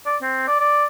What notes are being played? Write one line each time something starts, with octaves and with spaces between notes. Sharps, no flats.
D5
C4
D5
D5